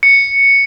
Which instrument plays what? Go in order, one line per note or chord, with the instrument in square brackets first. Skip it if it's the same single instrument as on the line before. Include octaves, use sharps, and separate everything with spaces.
[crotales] C#7